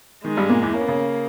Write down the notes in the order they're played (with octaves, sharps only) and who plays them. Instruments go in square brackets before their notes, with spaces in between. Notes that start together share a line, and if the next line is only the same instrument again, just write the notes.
[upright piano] D#3 [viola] G#3
[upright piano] G2 G3
A#2 A#3
E2 E3
[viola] A#3 [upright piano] C#4
[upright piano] B3
C#3 C#4